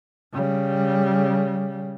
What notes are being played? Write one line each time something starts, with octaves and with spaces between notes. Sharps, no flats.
C#3 G3